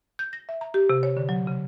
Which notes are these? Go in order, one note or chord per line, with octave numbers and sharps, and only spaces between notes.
G6
A#6
E5
A#5
G4
C3
C#5
D3
F#3
C#3